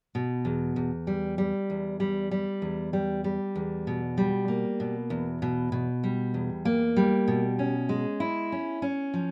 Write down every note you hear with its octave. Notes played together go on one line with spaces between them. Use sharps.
B2
E2
E2
G3
G3
E2
G3
G3
E2
G3
G3
E2
B2
G3
A#3
B2
E2
B2
B2
G3
E2
A#3
G3
B2
C#4
G#3
E4
C#4
C#4
F3